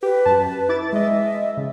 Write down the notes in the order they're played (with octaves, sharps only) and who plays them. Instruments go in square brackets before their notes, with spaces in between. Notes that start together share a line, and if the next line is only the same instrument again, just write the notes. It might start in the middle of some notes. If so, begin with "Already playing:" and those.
[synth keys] G4 [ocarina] B4
[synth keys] F#2 A5
E4 D6 A6
[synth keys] G#3 D#5 [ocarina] E5
[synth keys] C#3